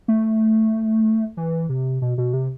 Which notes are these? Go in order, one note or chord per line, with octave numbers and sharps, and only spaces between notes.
A3
E3
C3
B2
B2
C3